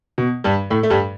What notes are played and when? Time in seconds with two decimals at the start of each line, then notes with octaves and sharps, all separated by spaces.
0.18 B2
0.44 G2 G3
0.70 A2 A3
0.83 A3
0.90 G2 G3